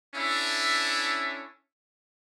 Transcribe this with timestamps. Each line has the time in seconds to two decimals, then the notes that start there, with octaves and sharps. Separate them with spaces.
0.15 C#4 D4 E4 A4 E5